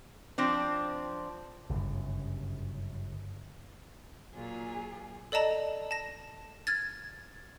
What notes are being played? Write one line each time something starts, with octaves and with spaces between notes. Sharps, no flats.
F3 C4 D4
G1 F#2 C#3
A#2 F#3 F4 G#4
A4 D5 D#5 A5 A#5
A5 A#6
F6 G#6 A6